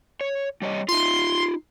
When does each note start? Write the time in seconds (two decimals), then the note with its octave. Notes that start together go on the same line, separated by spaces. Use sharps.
0.21 C#5
0.62 G3 C#5 D#5
0.88 D#4 F4 C6